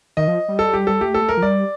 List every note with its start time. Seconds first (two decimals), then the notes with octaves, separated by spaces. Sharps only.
0.17 D#3 D#5
0.28 F3
0.49 G3
0.59 A4
0.73 G4
0.87 G3 A4
1.01 A3 G4
1.14 A4
1.21 A3
1.29 A#4
1.37 F3
1.42 G3 D5